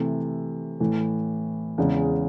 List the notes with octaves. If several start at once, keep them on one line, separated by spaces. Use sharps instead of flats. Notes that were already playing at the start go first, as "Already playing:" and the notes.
Already playing: C3 E3 A3
A2 E3 A3
E2 C#3 G#3